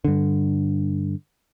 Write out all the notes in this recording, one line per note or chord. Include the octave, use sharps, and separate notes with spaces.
G2 D3